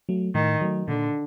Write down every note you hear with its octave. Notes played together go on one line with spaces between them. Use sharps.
F#3 A3
A2 D#3
F#3 A3
A#2 D3